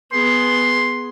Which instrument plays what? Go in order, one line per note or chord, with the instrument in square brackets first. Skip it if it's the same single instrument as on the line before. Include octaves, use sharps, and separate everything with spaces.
[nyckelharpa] B3 G#4 [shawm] C6